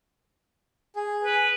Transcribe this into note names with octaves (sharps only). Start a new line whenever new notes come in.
G#4
B4